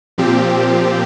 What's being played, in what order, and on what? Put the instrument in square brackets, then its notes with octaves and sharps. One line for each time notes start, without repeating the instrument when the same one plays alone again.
[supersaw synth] A#2 F3 C4 G4